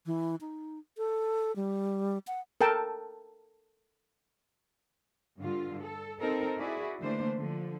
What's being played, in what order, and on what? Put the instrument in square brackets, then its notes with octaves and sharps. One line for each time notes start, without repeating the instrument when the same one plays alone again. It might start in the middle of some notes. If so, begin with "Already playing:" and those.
[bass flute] E3
D#4
A4
G3
F#5
[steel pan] A4 A#4 G5 A5
[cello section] G2 D3 F4
A4
C4 D#4 A4 A#4
E4 F#4 G#4 D5
D3 E3 A3 A#3 D4 C5
D3 F3